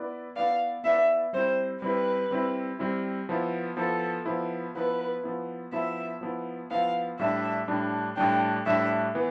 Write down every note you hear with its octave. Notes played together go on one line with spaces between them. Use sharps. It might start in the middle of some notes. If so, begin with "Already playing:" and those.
Already playing: B3 E4 B4 D5
B3 E4 B4 D5 F5
B3 E4 B4 D5 E5
G3 C4 E4 C5
G3 C4 E4 B4
G3 C4 E4
G3 C4 E4
F3 B3 E4
F3 B3 E4 A4
F3 B3 E4
F3 B3 E4 B4
F3 B3 E4
F3 B3 E4 E5
F3 B3 E4
F3 B3 E4 F5
A2 G3 D4 E5
A2 G3 D4
A2 G3 D4 G5
A2 G3 D4 E5
E3 B3